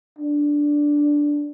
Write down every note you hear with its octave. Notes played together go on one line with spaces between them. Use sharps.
D4